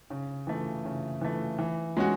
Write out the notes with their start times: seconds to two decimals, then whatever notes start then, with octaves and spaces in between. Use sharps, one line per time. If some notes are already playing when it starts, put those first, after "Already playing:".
0.10 C#3
0.47 E3 A3
0.85 C#3
1.21 E3 A3
1.59 E3
1.97 G#3 C#4 F#4